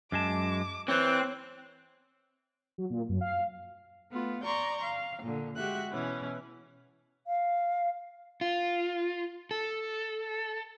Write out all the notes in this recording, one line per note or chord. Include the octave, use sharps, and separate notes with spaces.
F#2 G#3 A5 D6
E3 C4 C#5 F#6
F#3
A#2
F#2
F5
A3 B3 F4
D5 A#5 C6 C#6 G6
F5
A#2 D3
G#3 F#4 G4 E5 F#6
B2 E3 C#4
F5
F4
A4